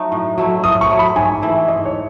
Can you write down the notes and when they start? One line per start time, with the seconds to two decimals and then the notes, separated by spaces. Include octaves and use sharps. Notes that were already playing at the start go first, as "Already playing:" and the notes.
Already playing: F#3 A3 D#4 F#4
0.12 A2
0.38 F#3 A3 E4
0.64 A2 D#6
0.81 C#6
0.90 F#3 A3 E4
0.99 B5
1.16 G#2 G#5
1.42 E3 A3 E4
1.68 G#2 D#5
1.85 C#5